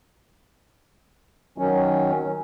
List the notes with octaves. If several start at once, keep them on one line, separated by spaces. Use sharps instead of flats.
D#3 F#3 C#4